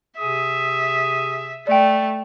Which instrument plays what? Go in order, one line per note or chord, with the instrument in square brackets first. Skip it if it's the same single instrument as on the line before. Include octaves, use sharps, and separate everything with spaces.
[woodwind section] C3 G#4 D#6 [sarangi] E5
[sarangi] A3 [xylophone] D5 G5